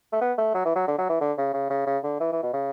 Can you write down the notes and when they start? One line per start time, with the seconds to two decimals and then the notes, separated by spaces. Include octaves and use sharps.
0.12 A3
0.21 B3
0.38 A3
0.54 F#3
0.65 E3
0.76 F#3
0.88 D3
0.98 F#3
1.09 E3
1.21 D3
1.38 C#3
1.53 C#3
1.70 C#3
1.86 C#3
2.04 D3
2.20 E3
2.32 E3
2.42 B2
2.53 C#3